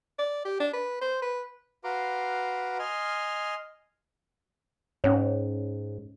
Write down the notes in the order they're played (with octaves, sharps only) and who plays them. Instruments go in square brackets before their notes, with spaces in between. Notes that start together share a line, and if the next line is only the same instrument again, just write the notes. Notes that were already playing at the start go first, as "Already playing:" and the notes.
[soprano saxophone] D5
G4
D4
B4
C5
B4
[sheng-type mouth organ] F#4 B4 F5 A#5 C6 D6
D#5 G#5 C6 F6
[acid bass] G#2 [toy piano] C#4 C#5